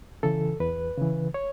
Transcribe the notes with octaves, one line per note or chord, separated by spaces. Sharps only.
C#3 E3 A4
E2 B4
C#3 E3
C#5